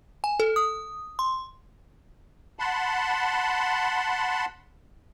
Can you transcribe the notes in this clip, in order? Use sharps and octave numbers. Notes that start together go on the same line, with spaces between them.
G#5
A4
D#6
C6
F#5 A5 B5 C6